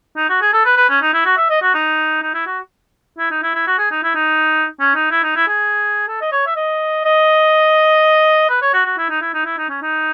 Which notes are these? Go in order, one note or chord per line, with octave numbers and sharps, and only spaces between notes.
D#4
F#4
G#4
A4
B4
B4
C#4
D#4
E4
F#4
E5
D#5
F#4
D#4
D#4
E4
F#4
E4
D#4
E4
E4
F#4
G#4
D#4
E4
D#4
C#4
D#4
E4
D#4
E4
G#4
A4
D#5
C#5
E5
D#5
D#5
B4
C#5
F#4
F#4
E4
D#4
E4
D#4
E4
D#4
C#4
D#4